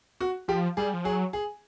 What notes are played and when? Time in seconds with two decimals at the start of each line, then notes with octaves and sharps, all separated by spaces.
0.20 F#4
0.48 F3 G4
0.77 G3 G#4
0.94 F3
1.04 F#3 G#4
1.33 G#4